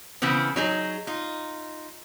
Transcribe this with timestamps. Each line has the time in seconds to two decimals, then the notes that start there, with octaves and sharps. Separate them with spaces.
0.22 C#3 E3 B3 C4
0.56 F#3 D#4 G#4
1.07 D#4 F4